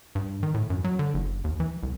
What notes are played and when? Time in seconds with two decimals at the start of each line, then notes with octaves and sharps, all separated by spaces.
0.15 G2
0.43 D#3
0.54 A2
0.70 F#2
0.84 F#3
0.99 D3
1.14 F#1
1.44 D#2
1.60 E3
1.83 C2